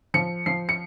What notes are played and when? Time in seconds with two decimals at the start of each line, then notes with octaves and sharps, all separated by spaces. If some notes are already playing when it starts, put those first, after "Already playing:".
0.14 F3 C#7
0.46 F3 C7
0.69 C#7